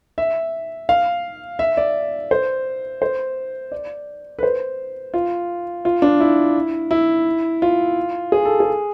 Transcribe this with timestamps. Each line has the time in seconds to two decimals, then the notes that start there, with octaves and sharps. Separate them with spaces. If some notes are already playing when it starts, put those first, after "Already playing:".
0.18 E5
0.89 F5
1.59 E5
1.77 D5
2.31 C5
3.02 C5
3.72 D5
4.39 B4
4.43 C5
5.14 F4
5.85 F4
6.02 D4
6.21 E4
6.91 E4
7.62 F4
8.32 G#4
8.45 A4
8.60 G#4